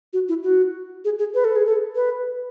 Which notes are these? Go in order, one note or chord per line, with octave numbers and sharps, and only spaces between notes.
F#4
E4
F#4
G#4
G#4
B4
A4
G#4
A4
B4